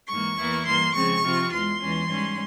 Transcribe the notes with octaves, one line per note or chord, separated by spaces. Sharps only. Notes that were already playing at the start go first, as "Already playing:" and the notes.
G#2 E3 A#3 C#6
E2 E3 A#3 E4
G2 E3 A#3 C6
C#3 F3 G#3 C4 C#6
C3 F3 C4 F4
E2 E3 G#3 C6
E2 E3 G#3 C#4
G#2 G3 C#4